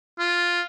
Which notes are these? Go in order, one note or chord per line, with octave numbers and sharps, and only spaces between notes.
F4